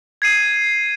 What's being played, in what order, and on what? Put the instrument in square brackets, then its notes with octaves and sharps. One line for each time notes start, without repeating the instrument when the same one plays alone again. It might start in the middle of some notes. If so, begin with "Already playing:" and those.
[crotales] G#6 C7 D#7